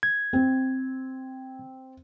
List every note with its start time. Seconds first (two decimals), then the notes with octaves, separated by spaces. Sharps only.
0.03 G#6
0.33 C4